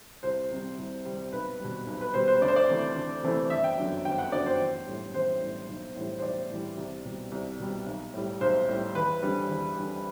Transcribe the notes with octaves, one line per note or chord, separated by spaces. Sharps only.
C2 C5
C3 G3
C2
C3 G3
B1 B4
B2 G3
B1
B4
B2 G3 C5
C5
D2 D5
C5
D5
C3 E3 A3
D2
C3 E3 A3
G1 E5
G5
F#2 D3 F#3
G1 G5
F#5
F#2 D3 F#3 D5
C5
A1
A2 G3
A1 C5
A2 G3
B1
A2 E3 G3
C5
B1 D5
A2 E3 G3
C2
B2 G3
C2
B2 G3
B1
A2 G3
B1 C5
A2 G3
E2 B4
D3 G3
E2
D3 G3